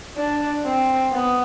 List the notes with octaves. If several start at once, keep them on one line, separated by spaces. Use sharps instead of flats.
D4
C4
B3